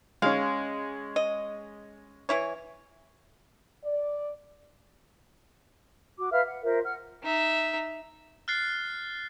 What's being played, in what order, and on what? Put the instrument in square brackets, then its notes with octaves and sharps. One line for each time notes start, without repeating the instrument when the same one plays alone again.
[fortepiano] G#3 C#4 [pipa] F5
[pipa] D#5
E3 E4 C#5
[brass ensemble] D5
[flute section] F#4 D6
B4 E5 F5 F6
F#5
F4 A#4 C5 E5
F#5 F6
[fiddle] D#4 E5
[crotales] F6 F#6 A6 C7